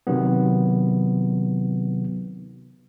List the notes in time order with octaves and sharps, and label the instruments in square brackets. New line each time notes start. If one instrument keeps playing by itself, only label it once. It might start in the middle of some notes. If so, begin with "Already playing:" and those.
[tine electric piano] C3 D#3 F#3 B3